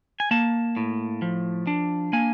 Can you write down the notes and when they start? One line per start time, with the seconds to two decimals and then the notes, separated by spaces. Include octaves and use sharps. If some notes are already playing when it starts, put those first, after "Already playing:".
0.20 G#5
0.31 A#3 A5
0.77 A2
1.22 F3
1.67 D4
2.13 A#3 G#5